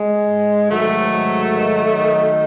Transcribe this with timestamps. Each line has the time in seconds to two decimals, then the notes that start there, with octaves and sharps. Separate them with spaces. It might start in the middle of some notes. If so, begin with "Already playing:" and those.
Already playing: G#3
0.27 G#2
0.69 D#3 F#3 A3
1.12 G#2
1.54 D#3
1.97 D#3